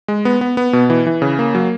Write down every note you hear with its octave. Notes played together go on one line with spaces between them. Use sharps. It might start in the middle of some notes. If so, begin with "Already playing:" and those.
G#3
B3
B3
B3
B2
E3
E3
C#3
A#3
F#3